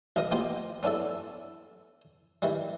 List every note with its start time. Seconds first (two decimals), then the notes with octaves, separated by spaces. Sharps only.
0.16 B1 B2 D#4 A#4 D#5 D#6
0.31 F3 A#3 B3 D#4 F4 G4
0.83 B3 C#4 D4 E4 A4
2.42 D#3 E3 G3